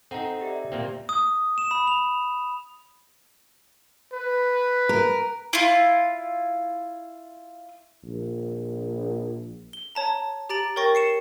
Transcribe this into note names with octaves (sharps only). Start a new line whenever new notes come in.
C4 D#4 A4 F#5 A#5
G4 D5 E5
A#2 A#3 C4
D#6
E7
B5
F7
B4
A#4
E4 F4
A#1
G7
C#5 A5 A#5
G4 A#5 A6 D7 F#7
A#4 C#5 G5 C#6 A6 A#6
C7 C#7 E7